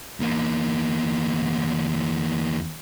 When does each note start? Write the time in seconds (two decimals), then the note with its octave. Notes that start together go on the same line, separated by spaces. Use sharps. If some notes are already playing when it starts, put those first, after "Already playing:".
0.20 E2 A#3